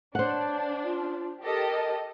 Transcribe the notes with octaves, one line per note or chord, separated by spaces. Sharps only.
D4 C5 C#5 F#5
F4
G4 A4 A#4 D#5